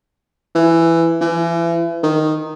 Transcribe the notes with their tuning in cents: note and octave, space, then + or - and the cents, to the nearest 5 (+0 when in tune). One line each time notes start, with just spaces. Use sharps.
E3 +10
E3 +35
D#3 -5